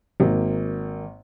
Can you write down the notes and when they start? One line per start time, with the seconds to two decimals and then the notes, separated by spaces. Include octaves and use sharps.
0.20 G#1 A#3